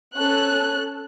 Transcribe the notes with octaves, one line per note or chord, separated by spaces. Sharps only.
C#4 A4 F#6